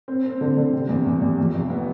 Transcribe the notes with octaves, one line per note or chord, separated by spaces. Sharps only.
C4
C4
D3
D3
C3
E2
E2
E2
F2
F1
B3